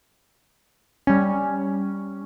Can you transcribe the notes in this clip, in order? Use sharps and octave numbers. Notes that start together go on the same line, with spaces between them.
G3 C#4